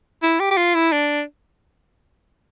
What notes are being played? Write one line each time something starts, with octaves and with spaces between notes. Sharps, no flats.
E4
G4
G4
F4
E4
D4